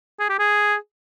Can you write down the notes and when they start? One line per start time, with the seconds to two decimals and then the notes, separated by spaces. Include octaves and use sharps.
0.19 G#4
0.29 G4
0.39 G#4